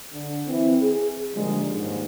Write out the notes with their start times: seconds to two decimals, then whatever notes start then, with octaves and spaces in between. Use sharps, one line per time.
0.12 D3
0.48 E3 C4
0.82 G#4
1.34 A#2 D3 D#3 F3 G3 G#3
1.73 D#2 G#2